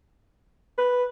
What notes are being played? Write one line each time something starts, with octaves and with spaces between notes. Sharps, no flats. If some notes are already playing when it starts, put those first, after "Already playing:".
B4